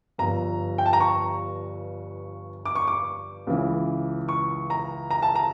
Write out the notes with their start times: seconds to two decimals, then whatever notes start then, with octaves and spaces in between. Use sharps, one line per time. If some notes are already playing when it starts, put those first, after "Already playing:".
0.18 G1 G2 F3 A#5
0.78 G5
0.86 A5
0.93 A#5
1.00 C#6
2.65 D6
2.75 C#6
2.88 D6
3.47 C#2 C#3 E3
4.29 C#6
4.70 A#5
5.11 A#5
5.22 A5
5.35 A#5